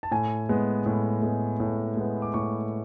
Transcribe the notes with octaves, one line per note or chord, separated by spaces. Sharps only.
A5
A2 G#5
G#3 B3
A2
G#3 B3
A2
G#3 B3
D6
A2 C#6